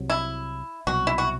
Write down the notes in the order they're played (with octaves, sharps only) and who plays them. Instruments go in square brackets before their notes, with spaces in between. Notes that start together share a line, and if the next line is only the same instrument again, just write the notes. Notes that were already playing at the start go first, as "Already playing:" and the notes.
Already playing: [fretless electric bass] C2 C3 F#3
[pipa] E4
[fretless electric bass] C2 B2 F#3 [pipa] F#4
[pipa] E4
F#4